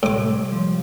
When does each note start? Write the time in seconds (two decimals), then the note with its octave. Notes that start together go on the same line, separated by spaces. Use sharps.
0.03 A2 C3 G3 G#3 D6
0.52 F3